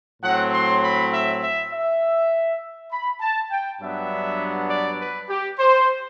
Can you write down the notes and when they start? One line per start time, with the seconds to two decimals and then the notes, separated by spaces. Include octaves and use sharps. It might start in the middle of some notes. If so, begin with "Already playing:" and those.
0.23 A2 F#3 C4 F#5
0.53 C6
0.83 B5
1.13 E5
1.42 E5
1.72 E5
2.92 B5
3.20 A5
3.51 G5
3.80 G2 F#3 B3 D4 E5
4.69 D5
4.99 B4
5.29 G4
5.59 C5